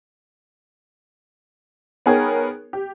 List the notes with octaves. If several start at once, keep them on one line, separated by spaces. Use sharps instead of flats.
B3 D#4 G#4 A#4 C#5 G5
G4